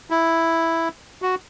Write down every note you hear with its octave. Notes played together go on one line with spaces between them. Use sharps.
E4
F#4